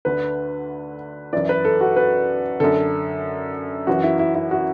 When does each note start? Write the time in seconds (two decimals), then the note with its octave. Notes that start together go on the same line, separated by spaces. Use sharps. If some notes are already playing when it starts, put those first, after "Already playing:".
0.05 D2 D3 B4
1.33 F#2 E3 D5
1.49 B4
1.65 A4
1.81 F#4
1.96 B4
2.60 F#2 D3 A4
3.87 F#2 E3 F#4
4.03 E4
4.19 E4
4.35 E4
4.51 F#4